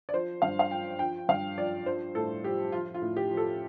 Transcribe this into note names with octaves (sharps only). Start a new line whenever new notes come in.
D5
F3 C5
G2 F5
F5
F3 G5
F3 G5
G2 F5
F3 D5
F3 C5
A2 A4
F3 G4
F3 F4
F4
A2
G4
F3
A4